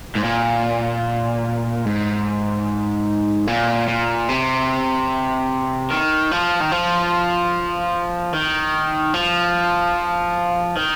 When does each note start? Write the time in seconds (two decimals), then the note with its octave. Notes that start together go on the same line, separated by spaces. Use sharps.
0.16 G#2
0.24 A#2
1.86 G#2
3.47 A#2
3.88 A#2
4.29 C3
5.91 D#3
6.32 F3
6.60 D#3
6.71 F3
8.33 D#3
9.14 F3
10.76 D#3